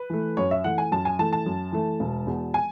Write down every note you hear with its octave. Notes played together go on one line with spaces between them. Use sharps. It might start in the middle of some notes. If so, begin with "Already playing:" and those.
Already playing: B4
E3 A3
F#2 C#5
E5
E3 A3 F#5
G#5
F#2 A5
G#5
E3 A3 A5
A5
F#2
E3 A3
E1
E2 B2
G#5